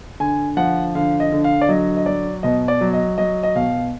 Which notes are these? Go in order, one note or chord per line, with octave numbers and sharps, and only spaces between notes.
D3 G#5
F3 F#5
D3 F5
D#5
D3
F5
D5
F#3 D#5
D#5
F#3 D5
B2 D#5
D5
F#3
D#5
F#3 D#5
D#5
B2 F5